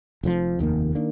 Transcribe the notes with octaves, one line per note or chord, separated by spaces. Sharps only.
F1 F2 C3 F3
F1 D#2 D#3 A#3
D#3 A#3 D4